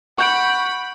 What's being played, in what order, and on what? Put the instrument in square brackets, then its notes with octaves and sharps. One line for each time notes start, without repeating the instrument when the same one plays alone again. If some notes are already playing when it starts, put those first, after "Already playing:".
[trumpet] F#5 [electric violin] B5 [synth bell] C#6 G6 D7